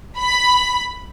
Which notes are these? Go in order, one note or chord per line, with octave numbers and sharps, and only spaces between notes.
B5